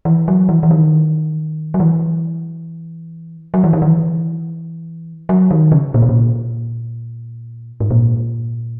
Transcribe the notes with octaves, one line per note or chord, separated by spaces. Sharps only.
E3
F#3
E3
E3
D#3
F#3
E3
F#3
E3
D#3
E3
F#3
D#3
C#3
A#2
B2
A#2
G#2
A#2